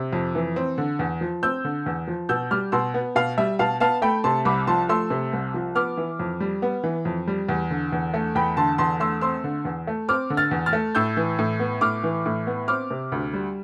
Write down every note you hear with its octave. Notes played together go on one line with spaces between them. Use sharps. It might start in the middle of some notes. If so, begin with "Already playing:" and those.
Already playing: C3
F2
E3
C4
D3
E2
F3
C4 E6 G6
D3
E2
F3
B2 E6 G6
G3 D6 F6
B2 C6 E6
B3
B2 F5
G3 E5
B2 F5 A5
B3 F5 A5
A3 G5 B5
C3 A5 C6
C2 B5 D6
F3 A5 C6
A3 C6 E6
C3
C2
F3
B3 D6 F6
E3
F2
G3
B3
E3
F2
G3
E2
D3
E2
A3
E2 G5 B5
D3 A5 C6
E2 A5 C6
A3 C6 E6
C4 C6 E6
D3
E2
A3
C4 D6 F6
D3
F6 A6
E2
F6 A6
A3
A2 E6 G6
E3
A2
B3
A2 D6 F6
E3
A2
B3
C4 D6 F6
C3
D2
G3